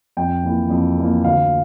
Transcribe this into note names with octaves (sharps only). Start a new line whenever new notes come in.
F2 G5
E3 A#3
F2
E3 A#3
D2 F5